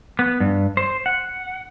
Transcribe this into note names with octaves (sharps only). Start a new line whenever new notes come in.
B3
G2
C5
F#5